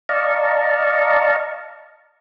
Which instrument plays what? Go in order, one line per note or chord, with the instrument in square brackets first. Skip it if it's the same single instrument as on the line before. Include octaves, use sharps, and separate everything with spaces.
[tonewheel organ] D5 D#5 F5 A5 A#5 C#6